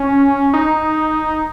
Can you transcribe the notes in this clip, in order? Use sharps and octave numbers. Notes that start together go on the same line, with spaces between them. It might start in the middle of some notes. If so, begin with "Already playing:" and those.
Already playing: C#4
D#4